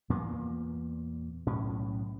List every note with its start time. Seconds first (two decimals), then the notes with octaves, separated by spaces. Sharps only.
0.09 E2 A#2 A#3 B3
1.47 B1 A2 C#4